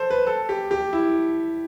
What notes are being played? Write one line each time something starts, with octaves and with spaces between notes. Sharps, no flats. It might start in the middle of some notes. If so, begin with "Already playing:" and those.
Already playing: A4 C5
B4
A4
G4
G4
E4